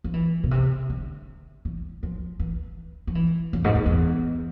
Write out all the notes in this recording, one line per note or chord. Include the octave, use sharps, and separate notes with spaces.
F3
E3
B2
C3
D3
E3
F3
E3
F3
E3
F2
G#2
F2
F2
E2